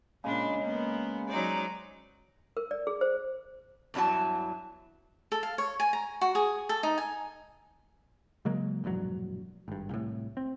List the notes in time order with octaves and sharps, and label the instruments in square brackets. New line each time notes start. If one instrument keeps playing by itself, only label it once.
[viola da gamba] A#2 D4 [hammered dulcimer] C#3 G#3 B5
[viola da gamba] A#3 B3
[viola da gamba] F#3 D#4 D5 [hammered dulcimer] C5
[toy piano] A#4
D5
G#4
C5
[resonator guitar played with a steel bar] E2 G2 E3 F#3 A5
[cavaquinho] A4
F5
C#5
G#5
A#5
F#4
G#4
A4
D#4
G#5
[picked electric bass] C#3 F#3 G#3 A#3
E1 A#1 G2 F#3
G#1 G2
C2 A2
C4